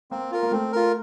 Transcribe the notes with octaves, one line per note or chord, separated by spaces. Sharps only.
A#3 C4
F4 A#4
A#3
A3 C4
F4 A#4